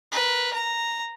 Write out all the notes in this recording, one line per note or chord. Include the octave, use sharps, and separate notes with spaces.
A#4 B4
A#5